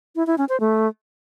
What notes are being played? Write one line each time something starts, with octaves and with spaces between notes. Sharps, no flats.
E4
E4
C#4
C5
A3